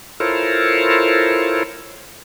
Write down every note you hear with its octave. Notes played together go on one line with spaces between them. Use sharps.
E4 F4 A4 A#4 C5 C#5